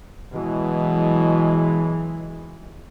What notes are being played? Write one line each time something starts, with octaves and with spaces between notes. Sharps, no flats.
B2 E3 F#3 G#3